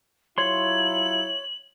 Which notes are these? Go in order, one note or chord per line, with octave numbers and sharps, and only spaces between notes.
F#3 E4 F4 C#5 C6 F#7